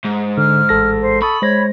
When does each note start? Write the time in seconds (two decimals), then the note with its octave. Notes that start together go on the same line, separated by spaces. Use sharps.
0.05 G#2
0.38 D3 F6
0.69 A1 A4 A#6
1.01 C5
1.22 A4 B5 C#6 D#6
1.42 G#3 C5 C#5 A#6